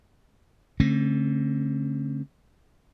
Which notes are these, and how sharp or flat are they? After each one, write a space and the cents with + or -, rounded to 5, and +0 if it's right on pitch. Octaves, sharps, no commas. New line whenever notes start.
D3 -35 A3 +0 C4 +40